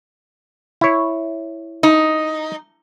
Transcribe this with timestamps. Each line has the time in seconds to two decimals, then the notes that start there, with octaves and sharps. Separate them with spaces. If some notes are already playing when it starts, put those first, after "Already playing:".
0.81 E4 C#5
1.83 D#4